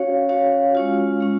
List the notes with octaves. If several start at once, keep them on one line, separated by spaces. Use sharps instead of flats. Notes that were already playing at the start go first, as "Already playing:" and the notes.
Already playing: C#4 F#4 C#5 F5
C#4 F#4 C#5 F5
G#3 C#4 F4
G#3 C#4